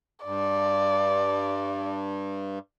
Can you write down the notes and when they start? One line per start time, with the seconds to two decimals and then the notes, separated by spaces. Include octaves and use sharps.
0.25 G2 D5